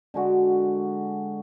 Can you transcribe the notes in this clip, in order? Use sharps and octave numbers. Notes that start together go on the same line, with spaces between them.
D3 G#3 F#4